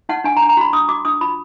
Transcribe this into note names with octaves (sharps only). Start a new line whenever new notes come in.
D#4 F#5
D4 G#5
A#5
D4
A#5
F#4 B5
D4 D#6
F#4 D6
D4 D#6
F4 B5